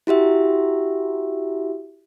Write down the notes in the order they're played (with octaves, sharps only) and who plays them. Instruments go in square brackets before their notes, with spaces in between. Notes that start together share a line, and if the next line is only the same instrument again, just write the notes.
[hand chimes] E4 F#4 G4 E5